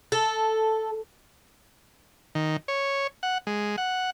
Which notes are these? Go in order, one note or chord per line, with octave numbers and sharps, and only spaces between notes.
A4
D#3
C#5
F#5
G#3
F#5